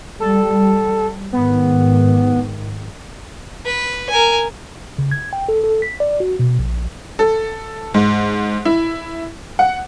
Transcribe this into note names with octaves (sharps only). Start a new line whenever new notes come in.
G3 A4
G#2 D#3 B3
B4
A#4 G#5
C#3
G#6
G5
A4
A4
B6
D5
F#4
B2
A#1
A4
G#2
E4
F#5